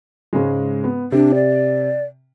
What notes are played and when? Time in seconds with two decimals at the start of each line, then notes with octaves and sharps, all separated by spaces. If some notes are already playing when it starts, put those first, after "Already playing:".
0.33 G#2 C#3 G#3
0.84 B3
1.12 C3 D4
1.34 D5